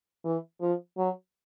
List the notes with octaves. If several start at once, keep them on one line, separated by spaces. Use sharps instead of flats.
E3
F3
F#3